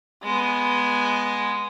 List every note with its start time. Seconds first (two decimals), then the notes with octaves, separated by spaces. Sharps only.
0.23 G#3 B3